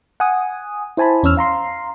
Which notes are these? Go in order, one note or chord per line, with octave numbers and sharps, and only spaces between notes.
F#5 G#5 D#6
E4 C5 G#5 A5 B5
E2 C#4 C#5 E6 F6
F5 A#5 C6 C7